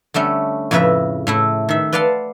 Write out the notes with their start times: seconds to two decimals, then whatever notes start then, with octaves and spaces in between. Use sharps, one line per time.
0.14 D3 G3 A3 C#4
0.71 F2 A2 C#3 B4 E5 A#5
1.27 A2 A3 E4
1.69 D#3 E5
1.93 B4 D5 F5 F#5 A5 C6